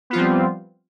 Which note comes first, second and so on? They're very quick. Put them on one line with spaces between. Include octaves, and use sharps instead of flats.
B3 F4 F3 C4 G3